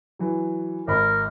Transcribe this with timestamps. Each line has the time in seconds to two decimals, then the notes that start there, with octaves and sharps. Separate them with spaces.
0.19 E3 F#3
0.87 G#1 A#4 B5